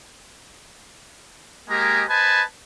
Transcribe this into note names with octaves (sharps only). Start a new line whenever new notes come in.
G#3 A#3 G4 D#5 G#5 A#5
B4 C5 D#5 G#5 A5 B5